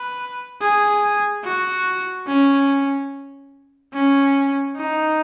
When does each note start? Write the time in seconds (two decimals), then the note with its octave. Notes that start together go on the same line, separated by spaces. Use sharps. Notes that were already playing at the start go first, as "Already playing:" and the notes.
Already playing: B4
0.61 G#4
1.44 F#4
2.27 C#4
3.93 C#4
4.76 D#4